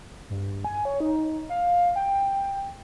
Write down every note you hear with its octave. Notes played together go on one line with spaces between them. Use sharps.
G2
G#5
C#5
D#4
F5
G5